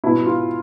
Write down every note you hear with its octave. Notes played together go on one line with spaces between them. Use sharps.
B2 E4
F4